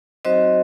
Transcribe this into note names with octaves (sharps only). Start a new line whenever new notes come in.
F#3 C4 D#4 F#4 C5 D#5